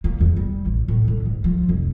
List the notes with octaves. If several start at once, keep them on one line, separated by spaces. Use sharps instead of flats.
A#3
E2
G3
A1
A2
D3
G#2
F3
F1